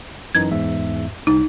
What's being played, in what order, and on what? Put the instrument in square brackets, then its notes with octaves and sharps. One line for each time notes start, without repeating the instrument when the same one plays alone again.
[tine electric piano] F#2 E3 D#4 [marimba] G#6
[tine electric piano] E2 G#2 E5
[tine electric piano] C2 [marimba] D#4